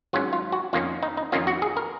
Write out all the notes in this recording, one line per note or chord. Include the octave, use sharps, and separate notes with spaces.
G#1 G#2 F#3 C#4 F4
F4
F#4
F2 D#3 A#3 C#4 F4
D#4
D#4
F2 D#3 A#3 C#4 F4
F#4
G#4
A#4